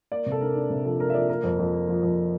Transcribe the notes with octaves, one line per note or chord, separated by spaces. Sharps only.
A#3 D5
C3
A4
D4 A#4
D4
C3
F3 A4
A#3 A#4
E5
F3 D5
A#3 A#4
F2
F2
A#3
F3
F2